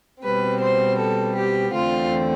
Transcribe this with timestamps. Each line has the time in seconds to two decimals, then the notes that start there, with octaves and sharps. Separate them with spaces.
0.23 B2 G3 C4 B4
0.61 C5
0.99 A4
1.36 G4
1.73 E2 D3 A3 C4 F4